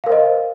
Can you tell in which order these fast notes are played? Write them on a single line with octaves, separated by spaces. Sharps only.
F5 A#4 C5 D#5